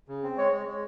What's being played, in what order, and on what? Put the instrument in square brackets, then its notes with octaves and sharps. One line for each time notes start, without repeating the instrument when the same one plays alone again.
[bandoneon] C#3
C4
[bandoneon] G#3 [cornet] C#5
[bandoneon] G#3
G#3